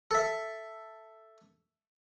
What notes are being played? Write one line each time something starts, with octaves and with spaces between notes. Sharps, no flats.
A4 E5